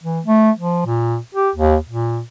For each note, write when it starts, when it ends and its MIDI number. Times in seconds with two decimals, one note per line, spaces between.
0.04 0.20 52
0.25 0.51 57
0.59 0.85 53
0.86 1.17 46
1.35 1.50 67
1.56 1.77 39
1.89 2.21 46